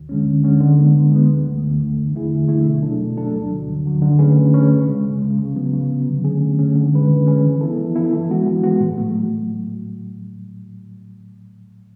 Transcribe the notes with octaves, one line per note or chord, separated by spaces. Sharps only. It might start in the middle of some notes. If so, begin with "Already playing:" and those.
Already playing: D2
D3 G#3 C#4
D2
D3 G#3 C#4
D3
G#3 B3
D3
G#3 B3
D2
D3 A3
D2
D3 A3
E2
D3 A3 E4 G#4
E2
D3 A3 E4 G#4
B2
F#3 A3 D4 A4
B2
F#3 A3 D4 A4
D2
D3 F#3
D2
D3 F#3
D3
A3 C#4 G#4 B4
D3
A3 C#4 G#4 B4
C#2
C#3 G#3
C#2
C#3 G#3
C#3
F#3 B3
C#3
F#3 B3
D3
A3 C#4 G#4
D3
A3 C#4 G#4
D3
G#3 C#4 G#4 B4
D3
G#3 C#4 G#4 B4
E3
B3 E4 A4
E3
B3 E4 A4
E3
G#3 B3 F#4
E3
G#3 B3 F#4
A2
F#3 A3